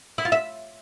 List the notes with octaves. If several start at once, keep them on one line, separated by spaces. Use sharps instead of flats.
E4
F4
E5